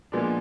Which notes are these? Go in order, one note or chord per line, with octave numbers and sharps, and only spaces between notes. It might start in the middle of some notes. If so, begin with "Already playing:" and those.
A#2 F3 G#3 B3 D4